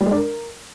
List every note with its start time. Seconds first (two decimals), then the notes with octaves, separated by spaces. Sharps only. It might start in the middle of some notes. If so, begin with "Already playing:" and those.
0.01 G3
0.06 G#3
0.11 D4
0.17 A#4